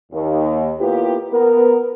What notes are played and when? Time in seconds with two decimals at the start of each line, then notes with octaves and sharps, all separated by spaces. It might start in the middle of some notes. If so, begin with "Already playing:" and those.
0.12 D#2
0.78 A#3 B3 E4 F4 G4
1.31 B3 A#4